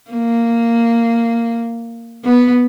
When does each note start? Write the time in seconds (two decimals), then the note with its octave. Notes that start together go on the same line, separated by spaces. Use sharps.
0.11 A#3
2.24 B3